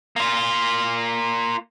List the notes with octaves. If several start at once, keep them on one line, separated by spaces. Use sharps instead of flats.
A#3 F4